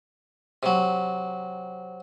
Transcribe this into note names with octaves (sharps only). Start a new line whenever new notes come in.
C3 F#3